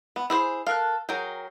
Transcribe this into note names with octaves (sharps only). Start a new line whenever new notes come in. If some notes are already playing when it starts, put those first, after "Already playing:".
B3
E4 G#4 C5
A4 A#4 F5 F#6
F#3 G#4 A#4 G5